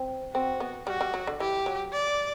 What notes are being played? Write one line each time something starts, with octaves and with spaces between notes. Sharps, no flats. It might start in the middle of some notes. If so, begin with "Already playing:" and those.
Already playing: C4
C4 F#4
B3
G3 F#4
G3
F#3
D3
E3 G4
F#3
D5